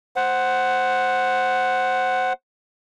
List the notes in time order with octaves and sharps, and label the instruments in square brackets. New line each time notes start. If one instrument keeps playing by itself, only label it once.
[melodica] C5 F#5